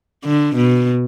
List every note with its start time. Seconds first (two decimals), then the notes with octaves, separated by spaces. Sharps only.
0.24 D3
0.56 B2